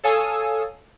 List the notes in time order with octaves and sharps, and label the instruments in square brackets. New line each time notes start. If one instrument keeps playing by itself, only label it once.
[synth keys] A4 C#5 F5 G#5 D#6 E6